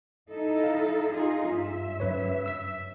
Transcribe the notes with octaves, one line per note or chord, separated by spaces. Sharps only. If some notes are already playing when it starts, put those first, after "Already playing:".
D#4 E4 A4
F5
D#4 F4 G#4
G2 E5
F#2 B4 C#5
E6 B6